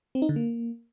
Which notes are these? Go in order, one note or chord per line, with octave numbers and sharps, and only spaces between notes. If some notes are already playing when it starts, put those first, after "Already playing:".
C4
D#4
D3
A#3